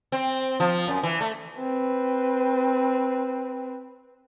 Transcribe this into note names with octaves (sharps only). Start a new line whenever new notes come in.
C4
F3
F#2
E3
A3
C4 B4